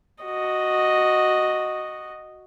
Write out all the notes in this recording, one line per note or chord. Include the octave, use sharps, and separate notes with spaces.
F#4 D#5